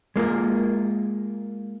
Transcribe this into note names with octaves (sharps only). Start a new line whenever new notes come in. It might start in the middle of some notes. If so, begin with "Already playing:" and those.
G#3 A#3 F4 A#4